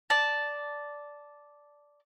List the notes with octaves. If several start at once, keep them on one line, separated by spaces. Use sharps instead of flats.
D5 A5